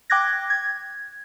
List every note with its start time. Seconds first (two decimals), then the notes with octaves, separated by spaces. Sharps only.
0.10 G5 D6 F#6 G#6 A#6
0.50 G#6